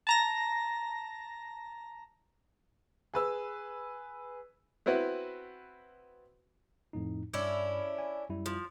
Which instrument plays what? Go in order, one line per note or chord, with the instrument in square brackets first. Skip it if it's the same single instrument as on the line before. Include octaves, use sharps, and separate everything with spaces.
[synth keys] A5 A#5 A#6
[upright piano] G#4 B4 E6
[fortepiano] B3 C4 E4 F#4 B4
[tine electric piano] F2 A2 D#4
[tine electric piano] G2 [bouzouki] C#4 D4 E4
[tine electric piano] G#5
F#2 G3 E4
[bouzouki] F3